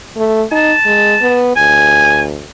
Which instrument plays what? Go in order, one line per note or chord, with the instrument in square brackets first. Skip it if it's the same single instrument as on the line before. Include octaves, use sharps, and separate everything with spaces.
[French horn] A3
[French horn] D#4 [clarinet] A5
[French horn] G#3
B3
[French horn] D2 [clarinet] G#5